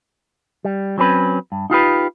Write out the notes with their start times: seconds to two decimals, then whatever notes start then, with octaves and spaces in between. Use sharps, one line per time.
0.65 G3
0.98 F#3 C4 C#4 B4
1.52 G2
1.70 D#4 F4 G4 B4